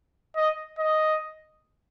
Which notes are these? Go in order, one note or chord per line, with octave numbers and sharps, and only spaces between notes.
D#5
D#5